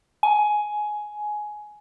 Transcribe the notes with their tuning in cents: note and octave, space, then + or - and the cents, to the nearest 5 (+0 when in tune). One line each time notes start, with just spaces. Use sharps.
G#5 +15